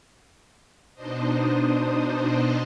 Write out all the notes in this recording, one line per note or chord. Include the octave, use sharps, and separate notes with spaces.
B2 D4 D#4 C5 D#5